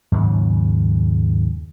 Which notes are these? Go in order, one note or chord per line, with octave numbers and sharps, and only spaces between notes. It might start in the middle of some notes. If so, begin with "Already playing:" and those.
D#2 G#2 C#3 F#3